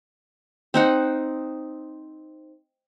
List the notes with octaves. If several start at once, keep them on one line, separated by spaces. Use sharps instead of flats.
C4 D#4 F#5